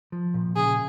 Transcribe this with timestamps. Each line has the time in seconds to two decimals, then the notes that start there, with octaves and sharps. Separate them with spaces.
0.12 F3
0.34 A#2
0.56 C#3 G#4